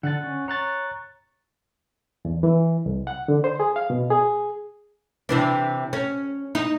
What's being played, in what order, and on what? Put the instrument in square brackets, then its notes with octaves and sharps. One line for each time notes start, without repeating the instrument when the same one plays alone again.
[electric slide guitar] D3 A4 [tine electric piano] F#5 F#6 A6
[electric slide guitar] C#4
[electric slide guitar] C#5 [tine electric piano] A#5 F#6 A6
[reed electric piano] E2
E3
C2
F#5
D3
C5
G#4
F5
B2
G#4
[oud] C3 E3 D4
C#4
D#4